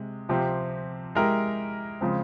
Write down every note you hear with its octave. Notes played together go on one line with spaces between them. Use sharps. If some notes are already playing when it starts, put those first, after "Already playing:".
Already playing: C3 G#3
C3 F3 C4 G4
G#3 E4 G4 A#4
C#3 F3 G#3 C4